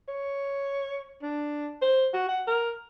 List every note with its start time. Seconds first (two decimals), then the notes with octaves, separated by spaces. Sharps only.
0.08 C#5
1.22 D4
1.82 C5
2.14 F#4
2.28 F#5
2.47 A#4